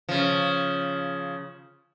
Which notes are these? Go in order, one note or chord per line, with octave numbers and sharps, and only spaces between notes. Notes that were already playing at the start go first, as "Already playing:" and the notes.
C#3 F3